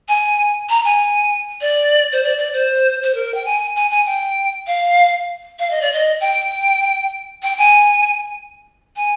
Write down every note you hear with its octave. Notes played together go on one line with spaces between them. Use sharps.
G#5
A#5
G#5
D5
C5
D5
D5
C5
C5
A#4
G5
G#5
G#5
G#5
G5
F5
F5
D#5
D5
D#5
G5
G5
G#5
G#5